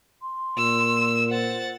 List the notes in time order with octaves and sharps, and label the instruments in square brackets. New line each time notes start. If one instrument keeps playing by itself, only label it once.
[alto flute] C6
[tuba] A#2 [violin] E6
[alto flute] C5 [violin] F#5 A6